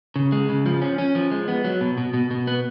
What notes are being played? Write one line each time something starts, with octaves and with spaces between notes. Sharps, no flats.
C#3
G#3
C#3
F3
C#4
C#4
F3
G#3
B3
F#3
B2
B2
B2
B2
B3